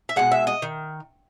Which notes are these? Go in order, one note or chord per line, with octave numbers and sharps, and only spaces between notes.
E5
B2 G#3 F#5
E5
D#5
D#3